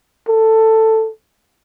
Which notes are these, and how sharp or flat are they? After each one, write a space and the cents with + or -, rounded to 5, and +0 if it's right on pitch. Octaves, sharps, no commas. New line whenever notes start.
A4 +10